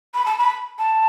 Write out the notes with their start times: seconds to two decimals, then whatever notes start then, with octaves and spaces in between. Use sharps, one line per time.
0.14 B5
0.26 A5
0.38 B5
0.78 A5